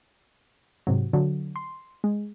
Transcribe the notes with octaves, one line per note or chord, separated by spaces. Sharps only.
G#2 C3 F#3
D3 F#3
C6
G#3